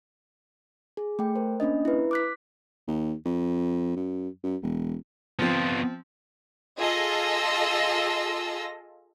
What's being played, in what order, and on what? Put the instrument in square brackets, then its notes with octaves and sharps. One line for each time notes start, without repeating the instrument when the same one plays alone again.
[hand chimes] G#4
A3 G5
A#4 C5
A#3 C#4 D4 D#5
E4 B4
D6 F#6 B6
[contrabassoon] D#2
F2
F#2
F#2
E1
[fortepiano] F3 C4 [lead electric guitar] B3 F4
[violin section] F4 G#4 A4 D#5 E6 A#6